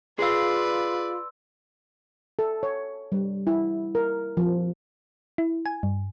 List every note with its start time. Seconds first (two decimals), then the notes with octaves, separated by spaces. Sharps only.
0.19 F4 G#4 B4 D5 F5 C6 E6
2.39 A4
2.63 C#5
3.12 G3
3.47 E4
3.95 A#4
4.37 F3
5.38 E4
5.66 G#5
5.83 G2